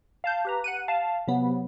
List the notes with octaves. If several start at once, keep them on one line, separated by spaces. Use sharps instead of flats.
F5 A5 G6
G4 B4 A#5
F#5 F#6 D#7
F5 A5
C3 F#3 B3